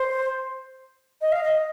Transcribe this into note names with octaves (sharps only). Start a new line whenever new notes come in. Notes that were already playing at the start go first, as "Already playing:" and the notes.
Already playing: C5
D#5
F5
D#5